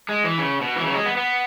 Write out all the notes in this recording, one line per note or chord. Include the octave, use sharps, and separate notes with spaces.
G#3
E3
C#3
B2
E3
C#3
F#3
G#3
B3
B3